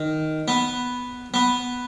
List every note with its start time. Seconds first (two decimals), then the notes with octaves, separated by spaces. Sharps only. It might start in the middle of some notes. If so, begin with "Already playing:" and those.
Already playing: D#3
0.48 B3
1.34 B3